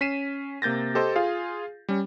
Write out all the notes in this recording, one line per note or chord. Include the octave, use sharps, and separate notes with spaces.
C#4 B6 C7 D#7 E7
C3 A#3 G6 A6 A#6
G4 A4 C5 D#5
F4 G#4 F5
G3 C#4